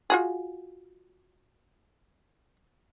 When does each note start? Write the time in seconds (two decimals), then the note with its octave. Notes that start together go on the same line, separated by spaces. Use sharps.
0.10 F4 F#4 G#4